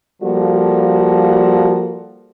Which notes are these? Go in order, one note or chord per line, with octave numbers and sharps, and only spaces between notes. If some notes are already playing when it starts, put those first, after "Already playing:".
F3 G3 A#3 F#4 A4